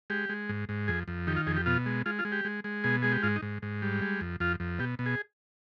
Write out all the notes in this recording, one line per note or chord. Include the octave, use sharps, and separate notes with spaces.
G#3 G4
G#3
G#2
G#2
F2 G#4
F2
D#3 G4
F4
F2 G#4
G4
B2 F4
G#3
G#3 F4
F4
G#3
G4
G#3
G#3
B2 G#4
G#3 G#4
G4
G#2 F4
D#4
G#2
G#2
G3
G#3
F2
F2 F4
F2
B2 G4
B2
G#4